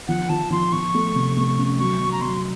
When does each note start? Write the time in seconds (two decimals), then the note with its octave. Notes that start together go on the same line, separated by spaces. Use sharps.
0.08 F3 F#5
0.29 F3 A5
0.51 F3 C6
0.73 F3 C#6
0.94 A3
1.15 C3
1.37 A3
1.58 C#4
1.79 F#3 C#6
2.00 F#3
2.12 A#5
2.21 F#3 C6